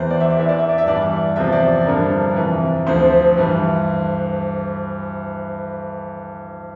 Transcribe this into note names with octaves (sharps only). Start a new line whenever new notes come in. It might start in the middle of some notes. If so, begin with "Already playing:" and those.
Already playing: E2 E3 C5
D5
E5
D5
E2 E3 E5
D5
E5
D5
E5
G2 E3 D5
E2 C3 F3 E5
D5
G2 D3 F3 A#4
F2 C3 E3
D2 D3 F3 C5
G2 E3